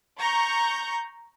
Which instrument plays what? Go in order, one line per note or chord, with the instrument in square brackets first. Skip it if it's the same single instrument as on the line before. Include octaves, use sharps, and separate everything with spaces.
[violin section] A#5 C#6 G6